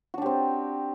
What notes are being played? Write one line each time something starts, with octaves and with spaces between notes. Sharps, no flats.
C4 D4 F#4 G4